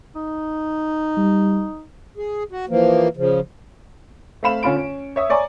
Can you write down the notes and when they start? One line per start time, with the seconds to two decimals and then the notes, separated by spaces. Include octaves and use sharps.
0.15 D#4
1.17 G3
2.17 G#4
2.51 F#4
2.69 E3 F3 A#3
3.17 C#3 F3
4.43 A3 C4 F5 B5 E7
4.63 D3 C#4 F4 B5 D7
4.76 C#4
5.16 C#5 E5 D#6
5.30 C#5 D5 G#5 A#5 C#6 D6